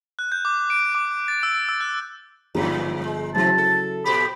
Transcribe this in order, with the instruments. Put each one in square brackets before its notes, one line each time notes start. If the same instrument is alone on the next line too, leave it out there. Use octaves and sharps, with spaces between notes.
[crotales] F#6
G6
D6
D7
D6
A6
E6
E6
F#6
[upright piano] G1 F3 A#5 [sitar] E2 G2 C#3
[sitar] G#3
[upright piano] C#3 F#3 E4 [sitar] E3 C4 [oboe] A5
[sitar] A4
[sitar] A#2 G4 [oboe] B5